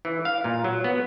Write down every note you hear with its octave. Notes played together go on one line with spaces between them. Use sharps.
E3
F5
A#2
F#3
B3